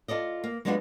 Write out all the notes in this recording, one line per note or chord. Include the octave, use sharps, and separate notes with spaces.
F4 A4 D5 D#5
A#3
F#3 G#3 B3 D4 D#4 F4